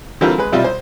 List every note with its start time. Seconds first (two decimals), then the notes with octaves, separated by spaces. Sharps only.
0.21 D3 E3 G3 C4 F4 A#4
0.38 G#3 B4
0.52 B1 C3 G3 E4 F4 D5
0.64 C5